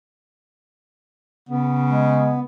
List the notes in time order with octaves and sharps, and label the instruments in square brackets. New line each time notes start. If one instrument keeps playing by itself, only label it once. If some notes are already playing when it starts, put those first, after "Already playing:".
[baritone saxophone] C#3 [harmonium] B3
[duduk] G#3